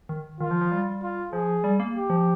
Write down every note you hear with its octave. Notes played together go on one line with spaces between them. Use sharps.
D#3
D#3 F4
F3
F3
G3
F4
F3 G#4
G3
A#3
G4
F3